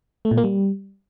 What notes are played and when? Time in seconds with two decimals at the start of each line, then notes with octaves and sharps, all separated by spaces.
0.25 A3
0.31 A#2
0.38 A#3
0.44 G3